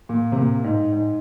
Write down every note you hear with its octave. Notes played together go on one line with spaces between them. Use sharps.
A#2
C3
A#2
G#2
G#2